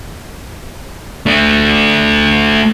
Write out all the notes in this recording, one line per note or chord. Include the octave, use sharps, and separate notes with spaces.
A3 D4